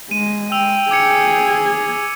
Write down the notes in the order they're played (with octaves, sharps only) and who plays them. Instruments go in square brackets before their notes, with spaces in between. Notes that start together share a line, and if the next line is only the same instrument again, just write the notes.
[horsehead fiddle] G#3 [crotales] D#7
[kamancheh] G5 [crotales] E6 F7
[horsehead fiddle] G#4 [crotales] D6 G#6 C#7